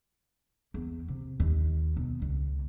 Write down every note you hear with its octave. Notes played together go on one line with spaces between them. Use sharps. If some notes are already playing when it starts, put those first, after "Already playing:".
E2
C3
D#2
B2
C#2